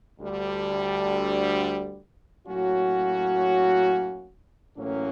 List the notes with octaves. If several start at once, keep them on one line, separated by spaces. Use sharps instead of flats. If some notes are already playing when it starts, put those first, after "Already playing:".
D2 D3 G3
A2 F#3 A#3 C#4 F#4
A1 A2 F#3 A#3 C#4